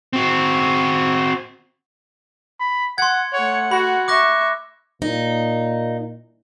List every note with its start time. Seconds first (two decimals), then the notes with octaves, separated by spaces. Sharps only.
0.13 C4 F#4
2.60 B5
2.98 F#5 C6 G#6
3.33 A3 C#5 F#5
3.71 F#4 B5
4.08 E5 C#6 D6 F#6 A#6
5.02 A#2 D#4